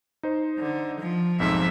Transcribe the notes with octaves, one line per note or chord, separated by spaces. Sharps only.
D#4 C5
D3
F3
B1 F2 G#2 F3 E5